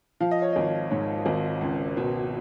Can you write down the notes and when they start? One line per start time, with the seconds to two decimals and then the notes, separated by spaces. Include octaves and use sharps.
0.20 F3 F5
0.31 D#5
0.42 C#5
0.53 G#1 D#5
0.91 G#2 C#5
1.26 G#1
1.61 C#2
1.97 B2